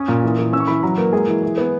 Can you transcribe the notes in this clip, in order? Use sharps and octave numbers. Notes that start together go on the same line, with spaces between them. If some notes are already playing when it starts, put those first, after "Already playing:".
Already playing: C#4 D#6
A#2
E3
E3
C#4 E6
C#6
E3 B5
F#3 A#5
A#3 B4
G#3 G#4
E3
E3
B3